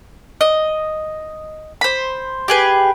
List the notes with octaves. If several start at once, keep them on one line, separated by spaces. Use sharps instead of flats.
D#5
C5 B5
G4 G#4 B4